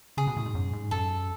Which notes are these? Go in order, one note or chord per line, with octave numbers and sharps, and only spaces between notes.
C#3 G#4
B2
A2
G#2
F#2
G#2
F#2 A4